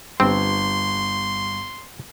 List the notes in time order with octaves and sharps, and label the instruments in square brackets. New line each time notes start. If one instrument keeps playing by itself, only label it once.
[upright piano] G1 [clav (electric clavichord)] C4 [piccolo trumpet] C6